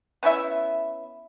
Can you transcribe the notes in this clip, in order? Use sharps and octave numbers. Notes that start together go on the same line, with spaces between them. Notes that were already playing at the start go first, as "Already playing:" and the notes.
B3 C#4 E4 E5